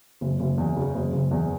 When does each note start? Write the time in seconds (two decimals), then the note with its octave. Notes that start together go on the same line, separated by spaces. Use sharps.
0.21 F#1
0.40 F#1
0.58 E2
0.77 C#3
0.95 F#1
1.13 F#1
1.31 E2